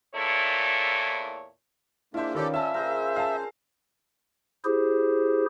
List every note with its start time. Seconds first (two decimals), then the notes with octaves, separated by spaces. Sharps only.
0.14 E2 A#2 E4 A4 C#5
2.14 G#3 A#3 D4 E4 F4 C5 E5
2.35 D#3 C#4 G4 A4 B4 D5 F5
2.54 C#4 E5 A5 E6
2.74 C#3 G#4 A#4 C5
3.16 F5 A5
4.64 E4 G4 G#4 C5